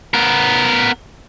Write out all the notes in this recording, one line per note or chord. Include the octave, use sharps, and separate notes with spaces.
B3 A#4